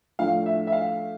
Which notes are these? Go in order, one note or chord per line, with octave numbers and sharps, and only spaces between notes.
A2 F3 A3 D4 F5
E5
E5
F5